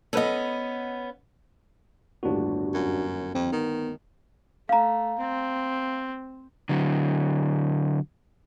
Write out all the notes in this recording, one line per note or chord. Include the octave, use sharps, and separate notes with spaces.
B3 C#4 A4 B4 D#5
G1 D#2 A2 D4 F#4
F#2
F2 C4
D#3 B3
A3 F5 A#5
C4
D3 F#3